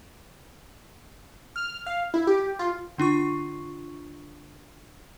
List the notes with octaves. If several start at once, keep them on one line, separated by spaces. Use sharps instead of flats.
F6
F5
E4
G4
F4
D3 D4 F4 C#6